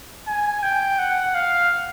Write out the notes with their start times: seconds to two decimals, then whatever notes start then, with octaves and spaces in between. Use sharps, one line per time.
0.28 G#5
0.63 G5
0.99 F#5
1.35 F5